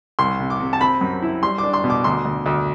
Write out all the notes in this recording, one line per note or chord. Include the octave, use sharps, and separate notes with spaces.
C2 C6
C3
D6
C3
A5
C4 B5
F#2
E4
G3 C6
D4 D6
C6
B2
D6
D2 C6
D2
D2